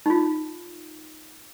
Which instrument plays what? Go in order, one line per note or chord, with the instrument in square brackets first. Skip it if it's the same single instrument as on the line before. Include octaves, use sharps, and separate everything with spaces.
[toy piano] D#4 F4